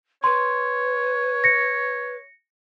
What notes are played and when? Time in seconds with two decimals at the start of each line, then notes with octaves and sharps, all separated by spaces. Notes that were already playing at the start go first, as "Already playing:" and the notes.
0.24 B4 C#5 C6
1.44 A#6 C#7